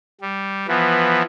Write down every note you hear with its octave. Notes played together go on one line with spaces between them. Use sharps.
G3
E3 F3 B3